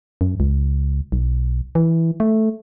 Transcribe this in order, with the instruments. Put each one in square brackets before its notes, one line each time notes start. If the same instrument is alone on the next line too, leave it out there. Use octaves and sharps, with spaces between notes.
[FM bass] F#2
C#2
B1
E3
A3